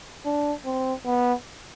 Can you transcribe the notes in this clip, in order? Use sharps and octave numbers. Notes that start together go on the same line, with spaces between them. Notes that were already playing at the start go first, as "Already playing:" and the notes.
D4
C4
B3